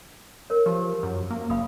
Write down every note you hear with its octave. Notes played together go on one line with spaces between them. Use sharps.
A#4 C#5
F3 G4
F#2
A#3
F#1 F5 B5 D#6